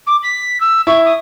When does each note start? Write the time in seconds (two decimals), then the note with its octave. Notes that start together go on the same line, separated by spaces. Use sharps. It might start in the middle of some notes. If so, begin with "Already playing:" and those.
0.06 D6
0.23 B6
0.60 E6
0.87 E4 C#6
1.04 D#6